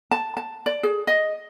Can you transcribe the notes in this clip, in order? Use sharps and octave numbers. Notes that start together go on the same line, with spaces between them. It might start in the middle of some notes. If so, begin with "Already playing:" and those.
A5
A5
D5
G#4
D#5